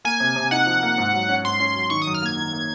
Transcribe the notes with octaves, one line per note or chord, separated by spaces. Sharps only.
A#3 G#5
C3
C3
D#4 F#5
F3
A#3
G#2
F#3
C#4
G#2 C6
C#4
F#3
D#3 C#6
F#2 D#6
F6
A#3 G#6
D#3
A#3